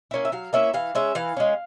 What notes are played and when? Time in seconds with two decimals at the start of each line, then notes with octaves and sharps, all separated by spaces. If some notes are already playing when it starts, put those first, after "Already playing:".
0.11 A#3 C#4 E4
0.25 E5
0.32 F#3 F5
0.53 A#3 C#4 E4 E5
0.74 E3 F5
0.95 G#3 C#4 E5
1.15 E3 F5
1.37 G#3 C#4